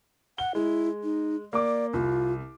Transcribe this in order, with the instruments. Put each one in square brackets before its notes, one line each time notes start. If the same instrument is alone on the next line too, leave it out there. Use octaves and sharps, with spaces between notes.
[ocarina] F#5 [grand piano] G7
[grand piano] G#3 [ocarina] E4
[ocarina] D#4
[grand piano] A#3 D6 [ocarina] D5
[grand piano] C2 [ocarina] F4